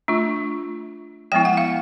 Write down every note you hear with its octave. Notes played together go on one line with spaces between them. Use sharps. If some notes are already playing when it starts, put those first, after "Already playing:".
A3 D4 F4
F3 G#3 B3 E4 G5
F#5
F5